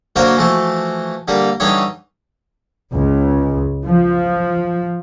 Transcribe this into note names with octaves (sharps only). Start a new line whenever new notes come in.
D3 F#3 A#3 A#4 C5
E3 F3 A3 F#4
D3 G3 A#3
D3 E3 G3 D#4 C#5
C#2
F3